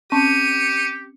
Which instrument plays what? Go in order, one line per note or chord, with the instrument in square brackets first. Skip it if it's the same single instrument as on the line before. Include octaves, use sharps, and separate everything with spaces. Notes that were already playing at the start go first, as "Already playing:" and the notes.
[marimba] C4 C#4 A5 [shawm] G4 [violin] C#7 D#7